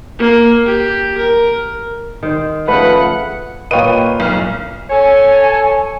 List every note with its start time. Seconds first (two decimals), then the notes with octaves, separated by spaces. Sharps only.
0.19 A#3
0.66 G4
1.18 A#4
2.23 D#3 C5
2.68 C#3 F3 A3 B4 F#5 C#7
3.71 A#2 B4 C#5 D#5 F5 G5 D#7
4.20 B1 F6
4.90 A4 C#5 G#5